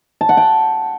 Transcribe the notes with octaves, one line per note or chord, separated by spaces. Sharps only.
A5
F#5
G5